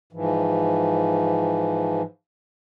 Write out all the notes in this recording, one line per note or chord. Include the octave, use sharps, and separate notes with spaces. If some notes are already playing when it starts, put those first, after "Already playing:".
G#2 E3 F3